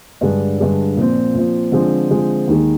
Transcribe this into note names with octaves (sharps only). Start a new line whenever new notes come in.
G2 D3 G#3 D4
G2 D3 G#3 D4
A#2 F3 C4
A#2 F3 C4
D3 F3 G#3 C4
D3 F3 G#3 C4
D#2 D#3 G#3